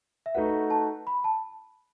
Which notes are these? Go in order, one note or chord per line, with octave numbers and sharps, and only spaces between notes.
E5
A3 D#4 F#4 B4 F#5
A5
B5
A5